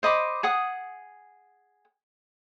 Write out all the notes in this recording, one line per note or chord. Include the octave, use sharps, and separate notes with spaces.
C5 D#5 B5 D6
G#4 F#5 D#6